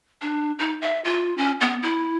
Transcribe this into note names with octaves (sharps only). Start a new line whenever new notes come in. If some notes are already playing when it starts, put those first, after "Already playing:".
D4
D#4
E5
F4
C#4
B3
E4